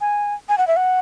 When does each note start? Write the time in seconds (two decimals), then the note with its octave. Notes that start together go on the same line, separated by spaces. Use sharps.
0.01 G#5
0.49 G#5
0.58 F#5
0.67 E5
0.76 F#5